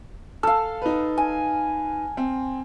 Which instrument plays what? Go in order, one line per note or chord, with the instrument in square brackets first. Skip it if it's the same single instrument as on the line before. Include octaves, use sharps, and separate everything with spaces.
[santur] A4 F5 [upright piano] E6
[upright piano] D#4 B4
[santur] G#5
[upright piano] C4